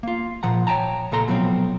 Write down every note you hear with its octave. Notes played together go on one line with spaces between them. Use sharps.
A#3 F4
A#2 F3 F#5 A#5
C#5 E5 G5 A5 A#5
C#2 A#2 A4 A#5 C6
B2 F3 F#3 A3 C4